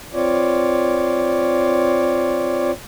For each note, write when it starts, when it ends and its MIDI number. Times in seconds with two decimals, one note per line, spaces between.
0.14 2.71 60
0.14 2.71 65
0.14 2.71 73
0.14 2.71 74